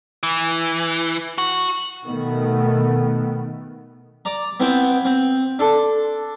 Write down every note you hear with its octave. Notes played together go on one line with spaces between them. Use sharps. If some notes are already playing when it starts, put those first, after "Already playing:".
E3
F#4
B2 D#3 A3 B3
D5 A#5
B3 C4 E4 C5 G5
C4
D4 A4 C6